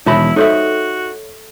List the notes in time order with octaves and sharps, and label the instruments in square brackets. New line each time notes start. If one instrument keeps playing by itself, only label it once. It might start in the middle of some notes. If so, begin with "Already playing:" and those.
[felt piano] E1 D#3 [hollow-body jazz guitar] E2 A5 B5 [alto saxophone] E4 [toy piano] C#5 E5
[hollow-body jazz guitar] D#4 C5 E5 [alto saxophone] F#4 [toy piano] G4 A4 [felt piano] C#5